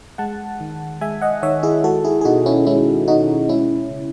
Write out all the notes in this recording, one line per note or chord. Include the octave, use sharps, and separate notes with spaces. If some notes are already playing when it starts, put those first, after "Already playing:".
G#3 F#5 A5
D#3
G#3 E5 G#5
D#5 F#5
D#3 C#5 E5
E4 G#4
G#3 F#4 A4
E4 G#4
G#4
B2 D#4 F#4
C#4 E4
G#3 C#4 E4
B2 D#4 F#4
G#3 C#4 E4
C#3